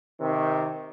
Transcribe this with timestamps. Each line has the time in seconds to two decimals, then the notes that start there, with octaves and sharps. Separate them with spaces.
0.19 C3 D#3